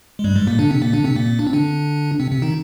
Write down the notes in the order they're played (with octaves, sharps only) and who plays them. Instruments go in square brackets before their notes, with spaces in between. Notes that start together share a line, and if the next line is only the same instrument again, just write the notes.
[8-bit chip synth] G#3
G2 G3
G#2 G#3
A#2 A#3
D3 D4
C3 C4
A#2 A#3
D3 D4
C3 C4
A#2 A#3
D4
C4
D3 D4
C3 C4
C3 C4
D#3 D#4